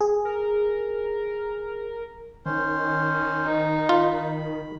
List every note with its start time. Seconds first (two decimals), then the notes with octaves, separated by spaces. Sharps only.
0.01 G#4
0.25 A#4
2.46 D#3 C#4 C5
3.45 D#4
3.89 F4 B5